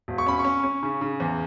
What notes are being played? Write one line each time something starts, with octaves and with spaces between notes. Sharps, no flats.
E1
C#6
C#4 B5
C#6
C#4
C#4
C#3
C#3
E2